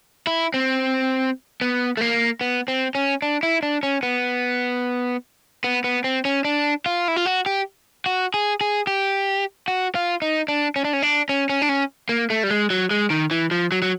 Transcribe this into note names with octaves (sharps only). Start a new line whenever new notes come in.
E4
C4
B3
A3
A#3
B3
C4
C#4
D4
E4
D4
C#4
B3
B3
B3
C4
C#4
D4
F4
E4
F4
F#4
G4
F#4
G#4
G#4
G4
F#4
F4
D#4
D4
C#4
D4
C#4
D4
C#4
C#4
D4
C#4
A#3
A3
G3
G#3
F#3
G#3
D#3
E3
F3
F#3
F#3